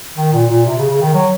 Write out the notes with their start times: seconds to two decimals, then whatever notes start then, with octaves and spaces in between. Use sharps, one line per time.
0.18 D#3
0.33 A#2
0.49 A#2
0.66 C3
0.78 C#3
0.90 C#3
1.02 D#3
1.14 F#3